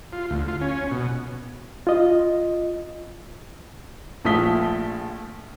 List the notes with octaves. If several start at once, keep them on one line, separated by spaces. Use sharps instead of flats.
F4
D2
F4
C#4
B2
F4 D#5
A#1 F3 A3 D#6 B6 G7